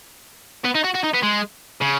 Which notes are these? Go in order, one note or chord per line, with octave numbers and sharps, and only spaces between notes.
B3
D#4
F#4
F#4
D#4
B3
G#3
C#3